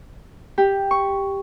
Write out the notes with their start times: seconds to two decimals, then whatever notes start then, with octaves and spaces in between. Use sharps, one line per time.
0.58 G4
0.91 C#6